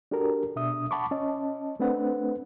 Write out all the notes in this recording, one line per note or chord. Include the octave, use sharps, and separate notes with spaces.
D4 F#4 G4 A4 A#4
B2 D4 E5 D#6
F#5 A5 B5 C#6 D6
C#4 D#5 A5
A3 C4 D4 B4 F#5